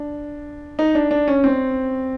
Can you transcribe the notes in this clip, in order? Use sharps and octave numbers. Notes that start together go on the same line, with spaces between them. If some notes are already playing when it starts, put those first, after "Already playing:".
Already playing: D4
D#4
D4
D4
C#4
C4